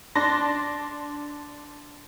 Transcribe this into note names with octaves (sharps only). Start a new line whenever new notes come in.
D4 C6 A#6